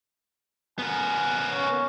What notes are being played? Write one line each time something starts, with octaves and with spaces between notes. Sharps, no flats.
B3 A#4 G#5
C#4